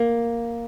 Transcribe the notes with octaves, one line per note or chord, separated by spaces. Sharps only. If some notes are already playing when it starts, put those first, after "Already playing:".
Already playing: A#3